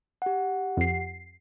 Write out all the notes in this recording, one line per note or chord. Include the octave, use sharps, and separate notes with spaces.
G4 F#5
F2 C7